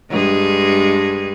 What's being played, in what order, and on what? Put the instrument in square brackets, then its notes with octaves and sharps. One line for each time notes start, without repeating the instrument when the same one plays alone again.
[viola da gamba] G2 G#3 G#4